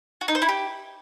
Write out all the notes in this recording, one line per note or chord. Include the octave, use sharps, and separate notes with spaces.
F#4
D#4
C5
E4
G4